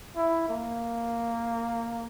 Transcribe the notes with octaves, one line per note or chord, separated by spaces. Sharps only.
E4
A#3